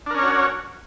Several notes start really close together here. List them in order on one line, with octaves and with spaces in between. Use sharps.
D4 A#4 C#4 C#5 F#4